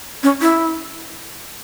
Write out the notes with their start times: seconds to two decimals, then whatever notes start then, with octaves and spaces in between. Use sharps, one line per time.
0.23 C#4
0.41 E4